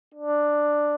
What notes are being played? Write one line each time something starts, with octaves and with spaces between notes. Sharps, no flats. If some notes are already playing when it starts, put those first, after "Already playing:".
D4